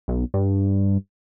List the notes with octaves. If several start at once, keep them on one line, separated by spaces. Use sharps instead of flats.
B1
G2